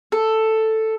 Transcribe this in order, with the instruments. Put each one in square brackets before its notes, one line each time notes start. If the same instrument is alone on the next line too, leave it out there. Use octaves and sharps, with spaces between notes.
[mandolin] A4